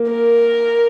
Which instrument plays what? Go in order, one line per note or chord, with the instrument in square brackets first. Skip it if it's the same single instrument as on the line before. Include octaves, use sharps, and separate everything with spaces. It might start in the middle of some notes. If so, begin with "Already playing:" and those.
Already playing: [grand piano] A#3
[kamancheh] A#4